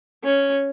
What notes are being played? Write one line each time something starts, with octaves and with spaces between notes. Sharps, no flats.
C#4